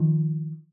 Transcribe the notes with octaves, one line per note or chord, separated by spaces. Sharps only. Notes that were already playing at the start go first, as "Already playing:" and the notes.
Already playing: D#3 F3